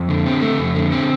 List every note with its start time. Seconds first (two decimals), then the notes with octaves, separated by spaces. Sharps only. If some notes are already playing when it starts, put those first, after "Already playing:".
Already playing: F2
0.09 D3
0.26 C4
0.42 A3
0.58 F2
0.75 D3
0.92 C4